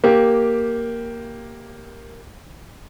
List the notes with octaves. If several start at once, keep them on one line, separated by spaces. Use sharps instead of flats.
A#3 G4